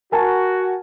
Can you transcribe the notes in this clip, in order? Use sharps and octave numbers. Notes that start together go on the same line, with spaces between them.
F#4 A#4 G#5 A5